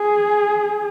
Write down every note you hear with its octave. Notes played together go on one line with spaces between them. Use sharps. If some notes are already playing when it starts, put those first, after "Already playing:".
Already playing: G#4